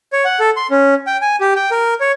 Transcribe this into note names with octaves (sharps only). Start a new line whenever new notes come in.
C#5
F#5
A4
C6
C#4
G5
G#5
G4
G5
A#4
C#5